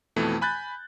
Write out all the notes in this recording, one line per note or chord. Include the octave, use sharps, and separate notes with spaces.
F2 B2 E3 A3
G#5 B5 F#6 G6 A6